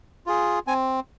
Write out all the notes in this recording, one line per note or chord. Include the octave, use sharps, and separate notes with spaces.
F4 G#4
C4 G#5